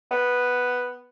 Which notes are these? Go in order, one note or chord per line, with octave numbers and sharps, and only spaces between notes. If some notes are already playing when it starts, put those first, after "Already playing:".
B3